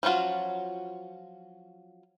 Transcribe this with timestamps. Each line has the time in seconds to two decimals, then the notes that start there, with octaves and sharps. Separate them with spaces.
0.03 F3 F#3 C#4 F4 F#4